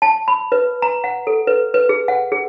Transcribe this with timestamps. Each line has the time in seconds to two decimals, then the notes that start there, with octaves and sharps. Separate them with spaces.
0.02 A5
0.28 B5
0.52 B4
0.82 A#5
1.04 F#5
1.27 A4
1.47 B4
1.74 B4
1.89 G#4
2.08 F#5
2.32 G#4